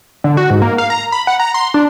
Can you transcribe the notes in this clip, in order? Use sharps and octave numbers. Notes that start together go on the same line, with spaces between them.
D3
F#4
G#2
A#3
F5
A#5
B5
F#5
A#5
C6
D4